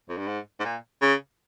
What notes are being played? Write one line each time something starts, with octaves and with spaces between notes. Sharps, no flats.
F2
G2
G#2
G#2
A#2
C#3